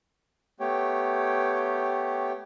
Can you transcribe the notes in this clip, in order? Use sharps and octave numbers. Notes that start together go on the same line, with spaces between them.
A3 B3 G4 C#5 G5